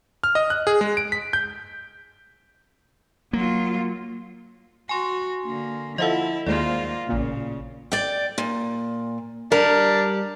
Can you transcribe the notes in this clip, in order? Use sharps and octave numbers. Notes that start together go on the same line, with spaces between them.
F6
D#5
F#6
G#4
G#3
D7
B6
G6
F#3 A#3 F4
F#4 G#5 C6
D3 A#3
F3 E4 A4 D#5 F5 F#5
D#2 G#3 A#3 F4 C5 D5
A1 A#2 C#3
D5 G5
A#2
G3 D4 A#4